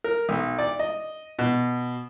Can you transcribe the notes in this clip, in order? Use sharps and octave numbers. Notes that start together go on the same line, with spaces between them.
A#4
B1
D5
D#5
B2